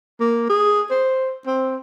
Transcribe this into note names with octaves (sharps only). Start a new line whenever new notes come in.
A#3
G#4
C5
C4